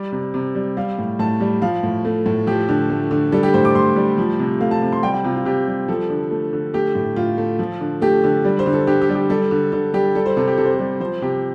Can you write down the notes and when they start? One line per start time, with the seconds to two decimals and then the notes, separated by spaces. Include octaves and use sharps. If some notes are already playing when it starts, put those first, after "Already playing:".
Already playing: G3 D5
0.12 C3
0.34 C3
0.55 G3
0.77 G3 F5
0.98 A2
1.19 A2 A5
1.40 G3
1.62 F3 F5
1.83 A2
2.05 A3
2.26 A2
2.47 F3 G4
2.69 D3
2.90 A3
3.11 D3
3.32 G3 A4
3.43 G4
3.54 A2 C5
3.65 D6
3.75 A2 C6
3.96 G3
4.18 F3
4.39 C3
4.60 A3 F5
4.71 A5
4.82 C3
4.92 C6
5.03 G3 G5
5.14 G5
5.24 C3 F4
5.35 F4
5.45 C3 G4
5.67 G3
5.88 F3 A4
6.10 D3
6.31 A3
6.53 D3
6.74 A3 G4
6.95 A2
7.16 A2 F4
7.38 A3
7.59 F3
7.81 D3
8.02 A3 G4
8.24 D3
8.44 G3
8.59 C5
8.66 D3
8.73 A4
8.87 D3 G4
9.01 G4
9.09 G3
9.15 G4
9.30 G3 A4
9.51 D3
9.72 D3 A4
9.93 G3 G4
10.15 G3 A4
10.26 C5
10.37 C3 A4
10.47 G4
10.58 C3 A4
10.66 C5
10.73 A4
10.79 G3
11.00 F3 C5
11.22 C3 G4